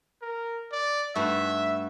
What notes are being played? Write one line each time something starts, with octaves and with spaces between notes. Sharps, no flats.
A#4
D5
G2 A3 F#4 E5